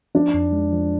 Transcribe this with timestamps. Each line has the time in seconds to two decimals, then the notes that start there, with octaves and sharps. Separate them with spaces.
0.15 F3 D4
0.34 F2
0.53 G#3
0.72 F3